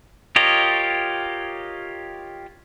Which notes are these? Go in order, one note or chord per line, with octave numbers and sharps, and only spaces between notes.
F4 G4 A#4 C#5 D#5